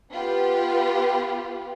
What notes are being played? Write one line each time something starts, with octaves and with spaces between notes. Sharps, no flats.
B3 F4 G4 B4